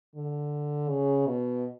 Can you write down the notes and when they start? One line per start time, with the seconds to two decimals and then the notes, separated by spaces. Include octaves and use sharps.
0.15 D3
0.89 C#3
1.27 B2